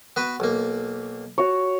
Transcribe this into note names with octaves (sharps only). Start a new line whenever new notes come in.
B3 F#4 B4
B1 A#3
F#4 C#5